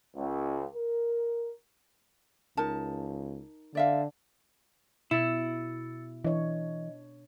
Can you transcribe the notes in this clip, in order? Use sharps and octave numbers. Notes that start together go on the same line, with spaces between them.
C#2
A#4
C#2 D#4 A#4 A5
D3 D5 E5 F5
B2 E4 E6 A6 C#7
E3 D4 C#5 D#5